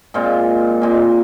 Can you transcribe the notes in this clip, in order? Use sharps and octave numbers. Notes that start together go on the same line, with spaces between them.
A#2 G#3 C4 F4
A#2 G#3 C4